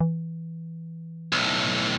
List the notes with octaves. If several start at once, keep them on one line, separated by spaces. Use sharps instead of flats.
E3
B1 A2